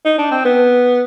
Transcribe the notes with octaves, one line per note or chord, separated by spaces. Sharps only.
D#4
D4
C4
B3